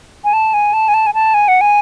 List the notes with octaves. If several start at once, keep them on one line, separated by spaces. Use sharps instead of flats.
G#5
A5
G#5
A5
G#5
A5
G#5
A5
G#5
F#5
G#5